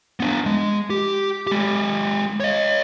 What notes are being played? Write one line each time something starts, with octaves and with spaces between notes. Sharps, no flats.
B3 D4
G#3
G4
G#3 G4
C#5 D#5